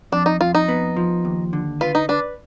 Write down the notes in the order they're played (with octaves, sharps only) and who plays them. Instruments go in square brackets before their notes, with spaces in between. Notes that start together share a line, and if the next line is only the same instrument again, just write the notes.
[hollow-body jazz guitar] F2 [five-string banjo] D4
[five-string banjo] D#4
[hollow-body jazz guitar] F2 [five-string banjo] F4
[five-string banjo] D#4
[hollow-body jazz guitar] B3
F3
D#2
D3
[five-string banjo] F4 [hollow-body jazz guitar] B4
[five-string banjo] D#4
[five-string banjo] D4 [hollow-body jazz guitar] B4